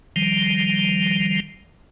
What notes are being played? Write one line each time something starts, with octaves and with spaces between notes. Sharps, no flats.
D#3 F3 G3